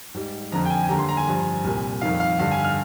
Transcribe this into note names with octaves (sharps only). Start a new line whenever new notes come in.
G#2 G3
F2 D3 F3 A#5
G5
G#5
G#5
D#2 D3 G3 A#5
C6
A#5
G#5
G2 F3
C2 A#2 G3
F2 D#3 G3 F5
F5
G2 D3 G3 F5
G#5
F6